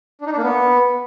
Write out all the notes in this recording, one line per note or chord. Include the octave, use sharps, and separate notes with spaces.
D4
D#4
D4
A#3
B3